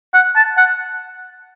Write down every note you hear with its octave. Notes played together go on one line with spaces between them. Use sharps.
F#5
A5
F#5